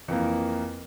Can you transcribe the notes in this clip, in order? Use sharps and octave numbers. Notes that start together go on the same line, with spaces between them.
F2 E3 A#3